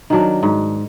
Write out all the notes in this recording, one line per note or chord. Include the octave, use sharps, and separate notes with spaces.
D#3 F#3 D4
G#2